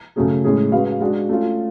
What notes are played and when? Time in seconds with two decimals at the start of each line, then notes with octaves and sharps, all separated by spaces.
0.16 C#3 F#3 A3 C#4 G#4
0.44 A2 G#3 C#4 G#4
0.72 G#3 C#4 F#4 B4 F5
1.01 G#3 D4 F#4
1.29 A3 C#4 F4